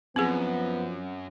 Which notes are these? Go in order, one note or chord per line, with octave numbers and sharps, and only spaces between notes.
F#2 F3 B3 C4 G#4